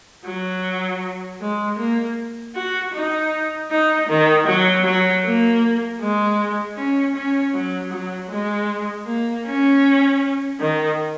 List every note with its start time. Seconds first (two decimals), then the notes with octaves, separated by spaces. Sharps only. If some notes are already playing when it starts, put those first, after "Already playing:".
0.25 F#3
1.41 G#3
1.79 A#3
2.55 F#4
2.93 D#4
3.71 D#4
4.09 D#3
4.47 F#3
4.85 F#3
5.24 A#3
6.01 G#3
6.77 C#4
7.15 C#4
7.54 F#3
7.92 F#3
8.30 G#3
9.07 A#3
9.46 C#4
10.60 D#3